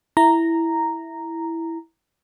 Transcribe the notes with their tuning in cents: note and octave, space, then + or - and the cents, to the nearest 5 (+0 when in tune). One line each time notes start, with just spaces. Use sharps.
E4 +0 A#5 -5